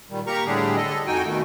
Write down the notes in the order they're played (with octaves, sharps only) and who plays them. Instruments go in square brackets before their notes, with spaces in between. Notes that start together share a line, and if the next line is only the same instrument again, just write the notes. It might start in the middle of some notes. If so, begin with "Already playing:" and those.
[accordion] A#2 D#3 G3
A#3 G4 A#4 A#5 C#6
A2 D3 G3 D4 G4 G#4
A4 D#5
F2 D#4 F#4 G5 G#5
B2 D#3 A3